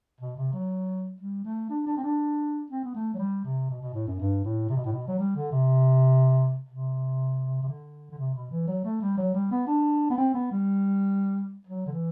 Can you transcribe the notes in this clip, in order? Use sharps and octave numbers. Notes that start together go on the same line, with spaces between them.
B2
C3
F#3
G3
A3
D4
D4
C4
D4
C4
B3
A3
F#3
G3
C3
B2
B2
A2
F#2
G2
A2
C3
B2
A2
B2
F#3
G3
D3
C3
C3
C3
D3
D3
C3
B2
E3
F#3
A3
G3
F#3
G3
B3
D4
B3
C4
B3
G3
F#3
D3
E3